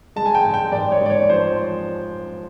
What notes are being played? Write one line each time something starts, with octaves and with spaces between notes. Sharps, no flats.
G#3 A5
G#5
G5
G#2
G5
G#2 D5
C#5
G#2 D5
C#5
F3 C5